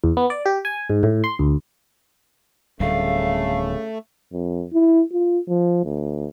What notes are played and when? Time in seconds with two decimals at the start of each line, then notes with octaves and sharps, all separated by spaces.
0.04 E2
0.17 B3
0.30 D5
0.46 G4
0.65 G#5
0.90 G#2
1.03 A2
1.24 C6
1.39 D2
2.80 D1 D2 C#3 G3 A3 F5
4.33 F2
4.73 E4
5.12 F4
5.48 F3
5.85 D2